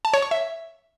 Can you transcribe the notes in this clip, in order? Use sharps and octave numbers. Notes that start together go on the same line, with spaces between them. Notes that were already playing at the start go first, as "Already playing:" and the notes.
A5
C#5
C#6
E5